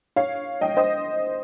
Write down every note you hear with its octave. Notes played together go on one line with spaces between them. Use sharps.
C#5 F5
D#5 G5
C5 D#5